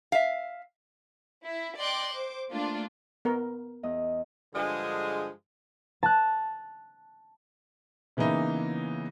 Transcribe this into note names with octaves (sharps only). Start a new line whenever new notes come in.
E5 F5
E4
D5 D#5 G5 C6 D6 F#6
C5 D6
A3 A#3 D4 F4
B3 A#4
E2 D#5
G2 D3 F3 G#3
A5 F#6
C#3 E3 A#3 B3 D#4 E4